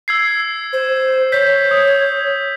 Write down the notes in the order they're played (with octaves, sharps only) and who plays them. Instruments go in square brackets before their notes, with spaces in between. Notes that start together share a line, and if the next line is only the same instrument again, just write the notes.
[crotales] E6 G#6 C7
[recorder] C5
[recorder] C#5 [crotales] G6 B6
[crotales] D#6